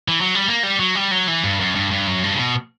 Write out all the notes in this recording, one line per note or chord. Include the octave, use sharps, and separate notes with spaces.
E3
F#3
G3
A#3
G3
F#3
G3
F#3
E3
G2
F#2
G2
G2
F#2
G2
C#3
B2